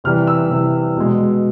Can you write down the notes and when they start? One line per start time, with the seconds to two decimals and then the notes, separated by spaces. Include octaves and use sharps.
0.04 C3 E3 G3 F6
0.27 E6
0.51 C3 E3 G3
0.96 B2 G#3